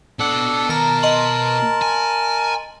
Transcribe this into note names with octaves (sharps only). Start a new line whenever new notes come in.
B2 D4 A4 F#5
D#3 A#4 A5 A#5
D#5 C6 F#7
G#5